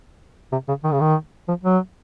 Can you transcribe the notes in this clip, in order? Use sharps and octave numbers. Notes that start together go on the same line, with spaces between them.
C3
C#3
D#3
C#3
D#3
F3
F#3